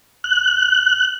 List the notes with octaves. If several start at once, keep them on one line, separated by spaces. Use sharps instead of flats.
F#6